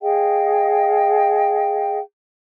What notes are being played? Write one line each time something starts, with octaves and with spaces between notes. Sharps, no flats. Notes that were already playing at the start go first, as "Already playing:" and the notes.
G#4 D#5 F5 G5